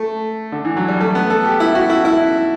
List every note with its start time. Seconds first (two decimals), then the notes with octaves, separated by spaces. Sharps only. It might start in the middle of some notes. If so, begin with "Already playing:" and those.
Already playing: A3
0.52 D3
0.65 E3
0.77 F#3
0.88 G3
1.00 A3
1.15 B3
1.30 A4
1.45 G4
1.60 E4
1.75 F#4
1.90 E4
2.05 E4